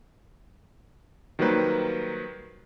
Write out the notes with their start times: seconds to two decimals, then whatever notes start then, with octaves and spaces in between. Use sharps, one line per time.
1.39 D#3 F#3 G3 A#3 B4 C5